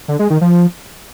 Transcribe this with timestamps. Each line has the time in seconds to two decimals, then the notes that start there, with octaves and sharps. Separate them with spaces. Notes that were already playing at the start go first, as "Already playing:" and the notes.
0.08 D3
0.19 G#3
0.30 D#3
0.41 F3